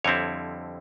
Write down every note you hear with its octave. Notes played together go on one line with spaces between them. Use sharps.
F2 D3 G3 C4 E4 C#5